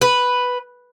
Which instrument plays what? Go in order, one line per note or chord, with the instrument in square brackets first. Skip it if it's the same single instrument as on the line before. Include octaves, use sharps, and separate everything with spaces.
[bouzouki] B4